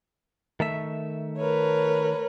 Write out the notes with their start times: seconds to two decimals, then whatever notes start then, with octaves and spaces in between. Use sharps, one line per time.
0.60 D#3 A3 E5
1.38 A#4 B4 C#5